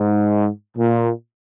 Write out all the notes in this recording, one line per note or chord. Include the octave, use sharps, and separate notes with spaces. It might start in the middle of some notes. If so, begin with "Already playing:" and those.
Already playing: G#2
A#2